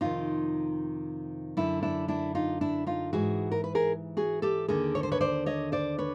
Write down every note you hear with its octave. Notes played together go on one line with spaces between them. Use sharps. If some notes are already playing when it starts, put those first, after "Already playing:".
F2 C3 D#3 D#4 F4
F#2 D3 D4 E4
D4 E4
D4 E4
D#4 F4
D4 E4
D#4 F4
G#2 E3 F#4 G#4
A#4
B4
G#4 A#4
F#4 G#4
G4 A4
D#2 D3 G#4 A#4
C#5
C5
B4 C#5
C5 D5
C#5 D#5
C5 D5
B4 C#5